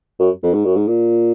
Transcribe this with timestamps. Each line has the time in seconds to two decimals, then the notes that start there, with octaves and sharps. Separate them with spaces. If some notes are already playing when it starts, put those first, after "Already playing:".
0.19 F#2
0.43 F2
0.54 G#2
0.65 F#2
0.76 G#2
0.88 A#2